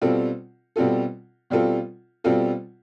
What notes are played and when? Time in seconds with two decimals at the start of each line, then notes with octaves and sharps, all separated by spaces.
0.02 B2 G3 C4 F4 A4
0.76 B2 G3 C4 F4 A4
1.50 B2 G3 C4 F4 A4
2.24 B2 G3 C4 F4 A4